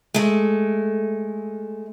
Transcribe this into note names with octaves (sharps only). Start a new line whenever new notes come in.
G#3 A3